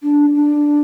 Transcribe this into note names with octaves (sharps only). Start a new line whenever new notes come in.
D4
D4